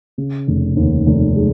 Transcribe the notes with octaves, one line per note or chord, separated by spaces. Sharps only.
C#3
F1
D#2
F1
G#3